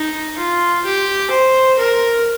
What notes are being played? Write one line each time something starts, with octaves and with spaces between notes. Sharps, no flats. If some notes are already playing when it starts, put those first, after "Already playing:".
Already playing: D#4
F4
G4
C5
A#4